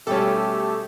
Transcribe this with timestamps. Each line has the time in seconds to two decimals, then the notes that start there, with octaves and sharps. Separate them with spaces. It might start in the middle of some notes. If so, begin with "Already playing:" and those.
0.07 B2 G3 A3 C#4 G4 A4